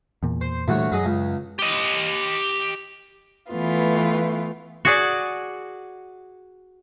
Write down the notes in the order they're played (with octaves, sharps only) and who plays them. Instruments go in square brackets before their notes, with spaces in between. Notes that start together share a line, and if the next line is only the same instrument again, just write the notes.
[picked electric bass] E2 A#2
[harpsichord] C5
[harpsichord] D2 F#4 C#5 [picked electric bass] A#2 E3 G3
[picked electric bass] F#2 [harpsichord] F#3 G#4 D#5
[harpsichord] C#2
[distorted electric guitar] G4 D#5
[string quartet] E3 A3 B3 F4
[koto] F#4 G#4 D5